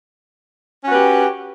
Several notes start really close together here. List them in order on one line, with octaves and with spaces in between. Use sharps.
C#4 F#4 B4 G4